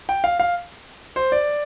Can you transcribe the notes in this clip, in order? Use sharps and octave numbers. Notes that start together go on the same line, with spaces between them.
G5
F5
F5
C5
D5